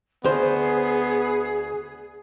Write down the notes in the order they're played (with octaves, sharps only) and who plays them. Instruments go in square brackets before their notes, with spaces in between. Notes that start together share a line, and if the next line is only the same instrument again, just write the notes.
[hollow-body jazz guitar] D2 C5 [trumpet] B3 [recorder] G#4